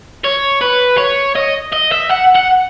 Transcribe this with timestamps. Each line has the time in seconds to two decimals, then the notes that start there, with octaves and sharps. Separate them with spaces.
0.24 C#5
0.61 B4
0.98 C#5
1.35 D#5
1.72 D#5
1.92 E5
2.10 F#5
2.35 F#5